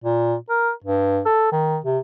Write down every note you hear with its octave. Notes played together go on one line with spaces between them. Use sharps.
A#2
A#4
G2
A4
D#3
C3